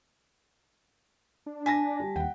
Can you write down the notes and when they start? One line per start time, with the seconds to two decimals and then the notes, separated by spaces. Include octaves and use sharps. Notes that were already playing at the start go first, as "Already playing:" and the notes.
1.46 D4
1.66 G#5 A5 A#6 B6
2.00 G3
2.16 D#2 F#5 G5